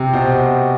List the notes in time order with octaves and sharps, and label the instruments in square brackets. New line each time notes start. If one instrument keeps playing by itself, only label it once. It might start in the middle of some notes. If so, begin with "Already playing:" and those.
Already playing: [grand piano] C3
B2 C5